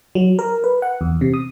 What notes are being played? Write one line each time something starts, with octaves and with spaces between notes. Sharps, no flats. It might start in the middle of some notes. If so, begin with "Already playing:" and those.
F#3
A#4
B4
F#5
E2
C3
D#6